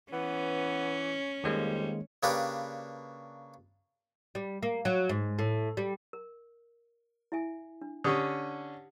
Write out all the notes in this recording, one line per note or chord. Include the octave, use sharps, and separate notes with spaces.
E3 B3 C#4
F2 D#3 G3 G#3 A#3
C#3 A#3 D4 G4 B4
G3
A#3
F#3
G#2
A2
G3
A#4
E4 E5 G#5
D4
D3 C#4 G4 D#6